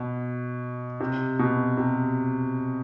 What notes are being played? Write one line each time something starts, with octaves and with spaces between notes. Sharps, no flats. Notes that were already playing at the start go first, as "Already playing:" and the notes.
Already playing: B2
C3
B2
C3